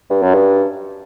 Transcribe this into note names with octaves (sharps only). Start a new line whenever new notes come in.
G2
F#2
G2